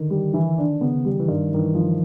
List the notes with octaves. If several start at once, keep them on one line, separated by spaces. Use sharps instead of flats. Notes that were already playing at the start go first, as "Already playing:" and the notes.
Already playing: D3 D#3
G3
E3
D4
C#3 B3
G3
E3
G2 D#3
G2 D#3
E3
F3